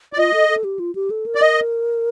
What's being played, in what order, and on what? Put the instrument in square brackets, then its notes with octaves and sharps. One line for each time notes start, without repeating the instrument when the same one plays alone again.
[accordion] D5
[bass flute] F4 [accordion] D#5
[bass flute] A4
A4
G4
F4
G4
A4
A#4
[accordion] D5
D#5